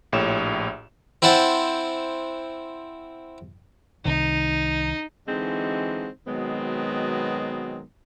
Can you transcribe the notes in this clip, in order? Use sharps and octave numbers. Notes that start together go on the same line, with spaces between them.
A#1 A2 G4 C#5 E7
C4 E4 C5 F#5 A5
C2 C3 D#3 D#4
D3 E3 G#3 C4 D#4 F#4
B2 D#3 F#3 G#3 B3 C4